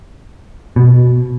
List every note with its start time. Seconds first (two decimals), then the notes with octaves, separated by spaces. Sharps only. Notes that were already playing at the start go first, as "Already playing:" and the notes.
0.76 B2